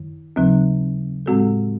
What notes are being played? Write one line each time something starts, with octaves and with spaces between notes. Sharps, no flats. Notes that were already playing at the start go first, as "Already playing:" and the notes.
Already playing: F#2 D#3
D#2 C#3 F#3 C4 D#4
A2 G#3 C4 F#4 A4